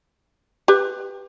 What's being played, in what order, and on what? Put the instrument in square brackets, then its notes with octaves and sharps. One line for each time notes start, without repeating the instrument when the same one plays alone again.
[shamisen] G4 B4